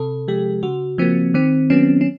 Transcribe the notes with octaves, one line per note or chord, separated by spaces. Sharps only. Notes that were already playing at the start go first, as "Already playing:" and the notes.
Already playing: C3 A4
F3 G#3 G4
C#3 F#4
F3 A#3 C4
D#3 C4
F#3 B3 C#4
C#4